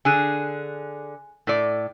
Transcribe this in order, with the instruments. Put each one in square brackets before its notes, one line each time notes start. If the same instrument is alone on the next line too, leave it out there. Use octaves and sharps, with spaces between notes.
[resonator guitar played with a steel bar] D3 G#4 [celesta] G#5 F#6
[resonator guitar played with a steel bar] A2 D5 [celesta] A4